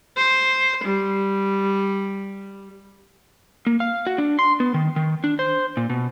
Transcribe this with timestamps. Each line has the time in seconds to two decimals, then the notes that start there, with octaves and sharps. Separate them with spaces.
0.17 C5
0.84 G3
3.67 A#3
3.80 F5
4.07 F#4
4.18 D4
4.39 C6
4.60 B3
4.74 D#3
4.96 D#3
5.24 D4
5.39 C5
5.77 A#2
5.90 B2